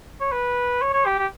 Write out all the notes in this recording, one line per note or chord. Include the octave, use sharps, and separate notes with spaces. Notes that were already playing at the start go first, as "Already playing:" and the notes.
C#5
B4
C#5
C#5
G4
G4